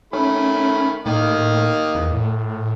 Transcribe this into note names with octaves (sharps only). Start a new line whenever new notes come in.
D#3 A3 C#4 B5
A2 D#3 A#3 D#5
E2
A2